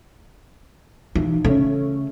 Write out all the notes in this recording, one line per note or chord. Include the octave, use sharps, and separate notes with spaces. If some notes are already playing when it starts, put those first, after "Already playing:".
B1 E3
C#3 A3 C#4